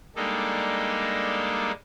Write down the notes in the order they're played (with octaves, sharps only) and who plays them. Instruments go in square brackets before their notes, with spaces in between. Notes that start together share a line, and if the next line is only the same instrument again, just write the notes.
[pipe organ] G3 G#3 A#3 D4 D#4 A4